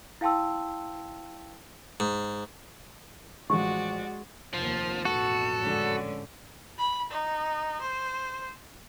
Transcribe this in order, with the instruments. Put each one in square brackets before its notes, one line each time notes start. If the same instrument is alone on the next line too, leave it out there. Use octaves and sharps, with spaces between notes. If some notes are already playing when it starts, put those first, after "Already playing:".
[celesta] E4 F5 G5 A5 C6 E6
[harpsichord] G#2
[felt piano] A1 F3 [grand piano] G#3 [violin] F#4 D5 [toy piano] C#6
[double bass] F1 D#2 [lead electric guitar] F3
[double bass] A1 F2 [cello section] B2 [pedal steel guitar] F#4 [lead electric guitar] A4
[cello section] G#2 D3 C#4
[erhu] B5
D#4
C5